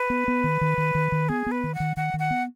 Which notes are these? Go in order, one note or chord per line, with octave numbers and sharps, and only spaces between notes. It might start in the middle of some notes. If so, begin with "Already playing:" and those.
Already playing: B4
B3
B3
D#3
D#3
D#3
D#3
D#3
B3 G#4
B3
B4
D#3
F#5
D#3
D#3 F#5
D#3
F#5
B3